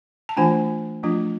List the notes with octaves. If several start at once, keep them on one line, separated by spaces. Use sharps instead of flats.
A5
E3 A3 D4 F4 G#5
F3 A3 D4 F4